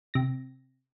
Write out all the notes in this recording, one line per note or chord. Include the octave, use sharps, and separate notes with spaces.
C3 A#6